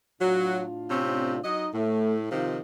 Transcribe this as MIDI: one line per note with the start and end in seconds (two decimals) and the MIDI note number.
0.21 1.40 45
0.21 0.63 54
0.21 1.40 62
0.21 1.40 65
0.90 1.36 48
0.90 1.36 60
0.90 1.36 61
1.44 1.68 54
1.44 1.70 63
1.44 1.68 75
1.74 2.29 45
1.74 2.16 57
2.31 2.59 48
2.31 2.59 51
2.31 2.59 53
2.31 2.51 63
2.31 2.51 65